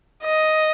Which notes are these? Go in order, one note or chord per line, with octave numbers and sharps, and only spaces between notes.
D#5